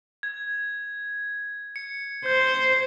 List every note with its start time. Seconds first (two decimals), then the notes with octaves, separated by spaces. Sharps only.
0.23 G#6
1.76 C#7
2.26 C5 G6